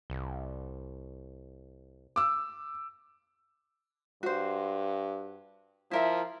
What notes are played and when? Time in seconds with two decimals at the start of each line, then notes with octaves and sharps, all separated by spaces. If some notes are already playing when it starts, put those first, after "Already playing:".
0.10 C2
2.16 D6 E6
4.23 G2 F#4 C5
5.91 F3 E4 A#4 E5